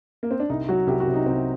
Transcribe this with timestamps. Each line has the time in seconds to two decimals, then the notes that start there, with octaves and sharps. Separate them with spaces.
0.23 A#3
0.31 C4
0.40 D4
0.50 C2 D#4
0.69 F#3 F#4
0.87 C2 G4
1.00 F#4
1.07 C3
1.14 D#4
1.26 C2 C4